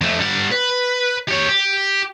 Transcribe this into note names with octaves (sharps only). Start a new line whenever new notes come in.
F2 A3
G3 F#5
B4
G4 C#5
G4